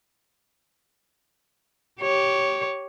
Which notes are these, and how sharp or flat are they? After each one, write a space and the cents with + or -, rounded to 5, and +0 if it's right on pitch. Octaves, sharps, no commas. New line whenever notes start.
G4 -15 C#5 +0